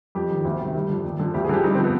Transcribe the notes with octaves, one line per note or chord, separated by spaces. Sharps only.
F2 G4
D#3
D2
C3 D#3
G2 G4
D3 F3
D#2
D3 F3
D2 G4
G#4
D3 F3 G4
G2 D#4
C4
F3
B3